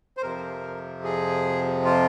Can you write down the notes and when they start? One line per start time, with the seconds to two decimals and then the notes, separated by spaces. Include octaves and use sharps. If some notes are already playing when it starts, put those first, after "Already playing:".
0.17 C5
0.23 F2 C3 F3 A#4
1.04 G#4
1.85 F4